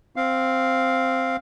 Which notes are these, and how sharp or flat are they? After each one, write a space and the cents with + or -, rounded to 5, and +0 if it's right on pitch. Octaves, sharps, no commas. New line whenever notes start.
C4 +0 F5 +0